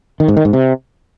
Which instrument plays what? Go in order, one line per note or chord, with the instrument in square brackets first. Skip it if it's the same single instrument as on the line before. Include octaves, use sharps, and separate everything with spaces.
[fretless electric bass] D#3
G#2
D#3
G#2
C3